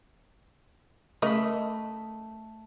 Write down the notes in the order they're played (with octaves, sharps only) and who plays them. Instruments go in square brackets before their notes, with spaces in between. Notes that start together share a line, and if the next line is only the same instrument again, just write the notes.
[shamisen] C#3 A#4 D#5 [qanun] A3 B5